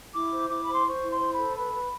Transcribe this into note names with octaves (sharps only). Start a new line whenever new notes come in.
E4 D6
C5
E4 D6
C5 B5
C6
C5 C#6
E4
C6
C5
B5
A4
B4 B5
B4